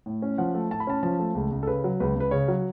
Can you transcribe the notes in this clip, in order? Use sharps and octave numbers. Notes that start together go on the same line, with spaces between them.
A2
C#4
F3 F#5
A3
A2 A5
B5
C#4 A5
F3 A5
A3
C#2
C#2
A4
C#3 B4
F#3
C#2 B4
C#2 B4
C#3 C#5
F#3